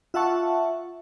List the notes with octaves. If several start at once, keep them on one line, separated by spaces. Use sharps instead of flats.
F4 E5 F#5 A5 C#6